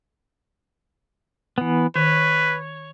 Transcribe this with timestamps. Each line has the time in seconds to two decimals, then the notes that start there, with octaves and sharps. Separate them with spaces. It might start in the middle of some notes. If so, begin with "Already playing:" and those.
1.58 E3 B3
1.96 D#3 B4 C#5